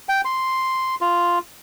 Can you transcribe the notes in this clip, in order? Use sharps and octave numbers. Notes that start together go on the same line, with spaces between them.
G5
C6
F4